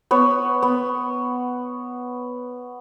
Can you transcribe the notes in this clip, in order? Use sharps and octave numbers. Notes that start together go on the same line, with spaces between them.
B3 C#5
B3